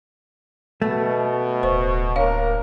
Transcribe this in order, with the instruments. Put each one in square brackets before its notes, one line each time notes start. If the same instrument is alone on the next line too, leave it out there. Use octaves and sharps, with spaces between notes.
[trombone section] B2 [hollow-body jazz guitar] A3
[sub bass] D1 [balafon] C5 C#6
[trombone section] A#3 D4 A#4 [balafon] C#5 F5